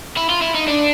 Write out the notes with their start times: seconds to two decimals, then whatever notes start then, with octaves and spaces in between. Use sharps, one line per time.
0.17 E4
0.29 F4
0.42 E4
0.54 D#4
0.67 D4